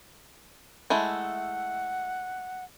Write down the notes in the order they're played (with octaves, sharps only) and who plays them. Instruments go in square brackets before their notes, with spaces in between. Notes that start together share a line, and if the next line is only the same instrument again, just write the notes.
[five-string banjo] G#3 A3 E4 [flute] F#5